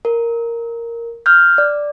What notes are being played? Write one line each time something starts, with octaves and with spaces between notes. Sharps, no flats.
A#4
F6 G6
D5